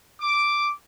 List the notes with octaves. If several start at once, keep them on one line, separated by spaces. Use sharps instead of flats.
D6